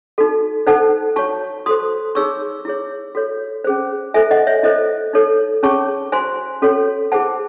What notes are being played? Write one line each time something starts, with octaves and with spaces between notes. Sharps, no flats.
D#4 F#4 A4
D#4 A4 C5 F#5 A5
F#4 C#5 A5 C#6
F#4 A4 C5 C6 D#6
D#4 G#4 C#5 C#6 E6
E4 G#4 C#5
F#4 A4 C#5
C#4 G#4 C5
E4 A4 C5 E5 G#5
D#5 F#5
C#5 E5
E4 A4 C5 D#5
D#4 A4 C#5
C#4 G#4 C#5 A5 C#6
F#4 C5 G#5 C6
C#4 F#4 A4 C#5
E4 G#4 C5 F#5 A5